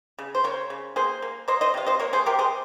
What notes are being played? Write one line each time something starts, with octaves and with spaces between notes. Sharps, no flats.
C#3
C5
C#3 A#4 C#5
C#3
A#3 G#4 C5
A#3
A#3 C5 D#5
C5 D#5
C3 F5
C5 D#5
A#3 A#4 C#5
G#4 C5
C3 G4 A#4
G#4 C5